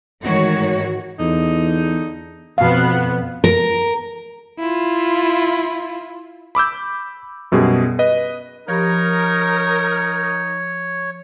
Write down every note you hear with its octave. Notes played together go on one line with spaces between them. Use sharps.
G#2 D#3 E3 A3 F#4 C#5
E2 D3 D#4
F2 B2 B3 F5
A#4
E4 F4
B5 D6 E6 G6
F#2 B2 G3 G#4
B4 D#5
F3 D#4 G4 A#4 C#5 B5